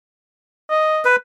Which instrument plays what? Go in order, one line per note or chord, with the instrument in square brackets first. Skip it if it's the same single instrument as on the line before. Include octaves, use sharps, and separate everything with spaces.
[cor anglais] D#5
[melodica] B4